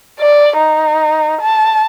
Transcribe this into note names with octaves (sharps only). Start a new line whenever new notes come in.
D5
D#4
A5